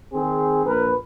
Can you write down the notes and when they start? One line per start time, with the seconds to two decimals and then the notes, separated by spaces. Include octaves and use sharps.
0.13 D#3 C4 G#4
0.65 A#1 A#4 B4